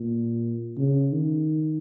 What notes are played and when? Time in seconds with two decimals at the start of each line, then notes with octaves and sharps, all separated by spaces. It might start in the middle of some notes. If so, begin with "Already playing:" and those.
Already playing: A#2
0.77 C#3
1.12 D#3